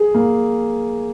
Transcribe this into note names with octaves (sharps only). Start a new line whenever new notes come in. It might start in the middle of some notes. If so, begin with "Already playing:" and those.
Already playing: G#4
A#3